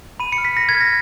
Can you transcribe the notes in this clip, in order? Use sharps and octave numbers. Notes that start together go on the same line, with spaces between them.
B5 D#7
C#7
F6
B6
B5 A#6
G#6
F6
A#6